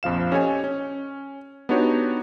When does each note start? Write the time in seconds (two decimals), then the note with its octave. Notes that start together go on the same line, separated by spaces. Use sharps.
0.03 A#1 F2 F3 F5 E7
0.32 C#4 G4 A4 C#5 D#5 G#5
0.64 C#4
1.69 B3 D4 D#4 F#4 G4 C#5